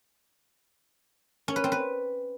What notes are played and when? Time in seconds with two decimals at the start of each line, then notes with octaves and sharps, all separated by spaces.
1.48 C#4
1.56 B4
1.64 C4
1.72 B4